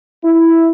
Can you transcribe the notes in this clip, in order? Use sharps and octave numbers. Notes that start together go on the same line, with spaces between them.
E4